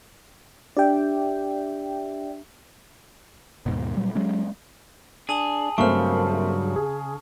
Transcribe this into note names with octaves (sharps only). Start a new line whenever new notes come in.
D4 G4 D5 E5 G5
D#2 G#2 B2
A#2 F#3 G3
F#3 G#3 C#4
D4 G#4 A5 D#6 F#7
G2 C#3 F#3 A3 A#3 C4 C#6 F6
G#4